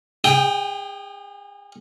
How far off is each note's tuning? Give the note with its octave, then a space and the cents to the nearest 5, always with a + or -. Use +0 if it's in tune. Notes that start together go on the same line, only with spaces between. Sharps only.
G#4 -35 G5 +0 D#6 +0